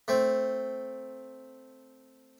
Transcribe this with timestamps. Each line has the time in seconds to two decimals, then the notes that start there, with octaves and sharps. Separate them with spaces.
0.08 A3 C4